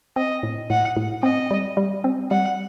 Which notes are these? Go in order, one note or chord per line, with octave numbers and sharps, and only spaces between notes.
C4 D#5
A2
A2 F#5
A2
C4 D#5
G3
G3
C4
G3 F#5